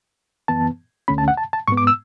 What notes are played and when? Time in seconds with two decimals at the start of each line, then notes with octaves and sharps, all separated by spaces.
0.48 F#2 E3 B3 A5
1.08 D2 D3 A3 C#4 B5
1.18 A5
1.28 F#5
1.37 A5
1.53 A5
1.68 G#2 G#3 B3 C#6
1.77 D6
1.87 E6